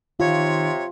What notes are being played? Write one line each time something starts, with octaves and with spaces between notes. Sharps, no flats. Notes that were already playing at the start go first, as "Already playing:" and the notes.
C3 D#3 F4 C#5